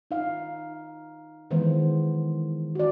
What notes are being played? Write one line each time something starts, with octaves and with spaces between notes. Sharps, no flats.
D#4 F5
D#3 E3 G#3 B3 C5
F#4 D5